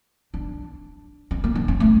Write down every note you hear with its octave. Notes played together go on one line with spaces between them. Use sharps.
D4
C#4
A#3
D4
C#4
A3